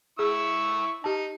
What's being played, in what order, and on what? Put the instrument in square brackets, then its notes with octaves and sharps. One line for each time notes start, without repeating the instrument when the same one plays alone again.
[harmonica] E4 C#6 E6 [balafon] G#4
[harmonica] D#4 [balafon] G4 A5